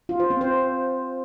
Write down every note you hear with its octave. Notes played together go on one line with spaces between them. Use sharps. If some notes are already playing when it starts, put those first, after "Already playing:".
F4
C5
C4
C5